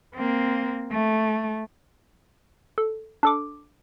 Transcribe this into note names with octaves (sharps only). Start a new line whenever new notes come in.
A#3 C4
A3
A4
D4 A4 D6